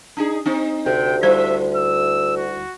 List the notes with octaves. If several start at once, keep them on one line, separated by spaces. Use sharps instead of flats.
D4 D#4 G#4
C4 D#4
D2 C3 G5
G3 E4 C5 E5
E6
F#4